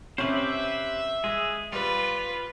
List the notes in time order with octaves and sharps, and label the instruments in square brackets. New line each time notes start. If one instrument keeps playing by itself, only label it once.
[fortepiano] C3 C#4 [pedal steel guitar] G4 B4 C5 [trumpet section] E5
[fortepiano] G#3 [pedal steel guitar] G#4
[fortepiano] G3 [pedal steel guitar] F4 [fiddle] B4